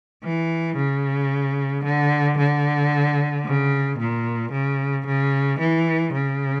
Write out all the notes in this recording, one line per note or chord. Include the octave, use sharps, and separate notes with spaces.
E3
C#3
D3
D3
C#3
A#2
C#3
C#3
E3
C#3